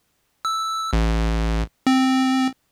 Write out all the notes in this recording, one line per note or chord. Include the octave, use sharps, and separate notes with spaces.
E6
A1
C4